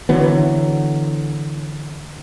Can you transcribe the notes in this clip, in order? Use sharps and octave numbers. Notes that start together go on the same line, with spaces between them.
D3 E3 F#3 B3